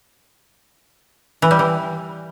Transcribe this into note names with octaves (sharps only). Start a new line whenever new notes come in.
E3
G3
E3